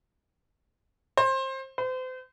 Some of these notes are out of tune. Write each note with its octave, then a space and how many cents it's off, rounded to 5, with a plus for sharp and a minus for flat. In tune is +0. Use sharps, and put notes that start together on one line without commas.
C5 +25
C5 -35